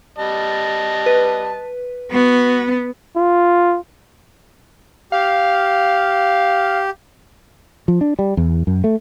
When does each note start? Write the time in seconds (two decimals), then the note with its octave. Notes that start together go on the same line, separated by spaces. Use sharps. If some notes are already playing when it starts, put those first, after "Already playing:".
0.19 G3 D#5 A5
1.06 B4
2.12 B3 F#4
3.16 F4
5.12 G4 F5
7.88 F3
8.01 D4
8.19 G3
8.37 E2
8.67 F#2
8.84 A3